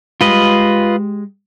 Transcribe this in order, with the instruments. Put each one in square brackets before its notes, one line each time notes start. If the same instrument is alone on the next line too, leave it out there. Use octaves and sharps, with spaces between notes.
[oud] G#3 G4 [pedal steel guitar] F4 B4 D#5